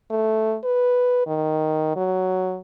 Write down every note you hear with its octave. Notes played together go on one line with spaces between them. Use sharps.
A3
B4
D#3
F#3